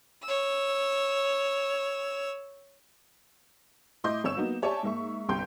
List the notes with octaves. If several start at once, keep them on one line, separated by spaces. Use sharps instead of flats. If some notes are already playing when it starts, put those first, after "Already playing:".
C#5 E6
A2 E4 D#5 C6 D6 G6
G1 C#5 E6 E7
F#3 A#3 B3 D#4
G4 C#5 D5 E5 G#5 A5
G#2 A#3 E5 C#6
G1 C2 G5 C6 G6